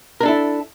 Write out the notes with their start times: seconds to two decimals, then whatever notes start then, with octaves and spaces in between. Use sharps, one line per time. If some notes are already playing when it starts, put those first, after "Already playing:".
0.21 A#4
0.23 D4
0.26 A4
0.28 E4